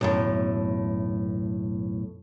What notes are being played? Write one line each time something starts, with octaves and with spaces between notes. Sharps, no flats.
B1 F#2 A2